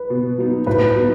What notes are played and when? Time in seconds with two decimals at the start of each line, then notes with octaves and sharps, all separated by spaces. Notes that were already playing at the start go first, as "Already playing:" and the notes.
Already playing: B4
0.10 B2
0.38 F#3 B3 D#4
0.67 A2 B4
0.96 F#3 B3 D#4